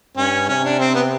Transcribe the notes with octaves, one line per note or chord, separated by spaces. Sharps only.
G2 C#4
C3 C#4
D4
C4
B3